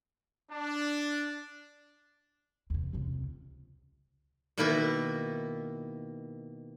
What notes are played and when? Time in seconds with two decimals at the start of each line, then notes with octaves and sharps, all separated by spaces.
0.51 D4
2.70 E2 C3
2.93 C#2 C3
4.58 B2 D#3 A#3 E4 A#4 B4